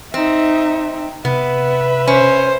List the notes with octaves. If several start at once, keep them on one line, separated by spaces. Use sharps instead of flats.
C4 D#4 E5
C3 B3 B4 E5
C#4 C5